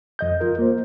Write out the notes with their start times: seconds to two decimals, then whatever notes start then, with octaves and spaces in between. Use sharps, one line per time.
0.19 F2 D#5 G6
0.40 F4 A#4
0.59 A#3 C5